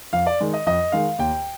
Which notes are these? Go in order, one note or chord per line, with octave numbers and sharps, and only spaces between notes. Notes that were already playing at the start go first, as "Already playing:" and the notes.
F2 F5
D5
D#3 G#3
D#5
F2 D#5
D#3 G#3 F5
D#2 G5